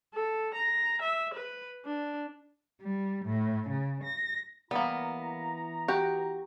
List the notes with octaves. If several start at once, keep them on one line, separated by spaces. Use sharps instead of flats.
A4
A#5
E5
B4
D4
G3
A2
C#3
A#6
E3 G3 A#3 B3 E4 A#5
F#4 G4